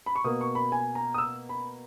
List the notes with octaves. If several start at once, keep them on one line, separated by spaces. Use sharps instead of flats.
B5
C#6
B2 A#3 D#6
C#6
B5
G#5
A#5
D#6
E6
B5